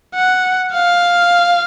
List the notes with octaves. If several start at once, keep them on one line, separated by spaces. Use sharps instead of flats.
F#5
F5